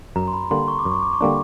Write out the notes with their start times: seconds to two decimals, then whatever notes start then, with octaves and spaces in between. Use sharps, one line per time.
0.16 F#2 A#5
0.28 C6
0.33 B5
0.51 D3 G3 A#3 D4 C6
0.68 C#6
0.79 D6
0.85 F#2
0.92 C#6
1.03 D6
1.13 C#6
1.21 D3 G3 A#3 D4